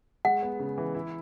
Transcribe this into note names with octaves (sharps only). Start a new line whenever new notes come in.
G#3 F#5
B3
C#3
E3
E4